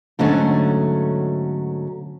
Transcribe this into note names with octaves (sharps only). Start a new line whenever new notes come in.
G#2 D3 F#3 A3 C#4